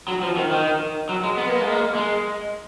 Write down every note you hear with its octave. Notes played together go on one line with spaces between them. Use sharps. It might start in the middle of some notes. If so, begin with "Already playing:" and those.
F#3
F3
D#3
D#3
F#3
G#3
B3
A#3
G#3
A#3
G#3